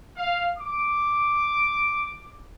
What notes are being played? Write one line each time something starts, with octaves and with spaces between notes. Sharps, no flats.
F5
D6